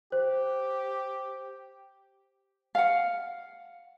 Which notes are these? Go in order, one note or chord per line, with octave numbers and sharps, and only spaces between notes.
G4 C5
F5 F#5